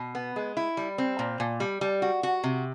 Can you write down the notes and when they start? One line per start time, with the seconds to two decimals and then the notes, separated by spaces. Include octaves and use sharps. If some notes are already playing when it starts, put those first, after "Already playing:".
Already playing: B2
0.15 B3
0.36 G#3
0.57 E4
0.77 G3
0.98 C4
1.19 A#2
1.40 A#2
1.60 G3
1.81 G3
2.02 F#4
2.23 F#4
2.44 C3